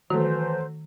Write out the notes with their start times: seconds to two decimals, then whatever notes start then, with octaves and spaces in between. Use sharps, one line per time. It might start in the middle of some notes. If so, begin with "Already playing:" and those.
0.10 D#3 E3 F#3 A3 C5